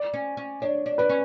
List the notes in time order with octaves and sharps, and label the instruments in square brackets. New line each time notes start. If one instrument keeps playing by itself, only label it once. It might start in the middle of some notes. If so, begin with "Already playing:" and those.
Already playing: [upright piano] D5
[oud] C#4
C#4
[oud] D4 [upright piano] C#5
[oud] D4
[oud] D4 [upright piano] B4
[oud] C#4